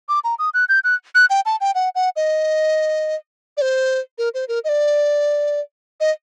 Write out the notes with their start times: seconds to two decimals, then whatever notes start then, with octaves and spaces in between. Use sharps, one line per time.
0.09 D6
0.24 A#5
0.39 D#6
0.54 F#6
0.69 G6
0.84 F#6
1.15 F#6
1.30 G5
1.46 A5
1.61 G5
1.75 F#5
1.95 F#5
2.16 D#5
3.57 D5
3.61 C5
4.18 A#4
4.34 C5
4.48 A#4
4.64 D#5
4.69 D5
6.00 D#5